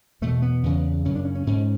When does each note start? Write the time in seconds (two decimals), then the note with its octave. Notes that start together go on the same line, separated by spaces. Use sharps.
0.21 E2 B2 A3
0.42 B3
0.63 E2 C#3
1.05 F#2 C#3 C#4
1.15 D4
1.25 C#4
1.35 C#4
1.47 G#2 C#4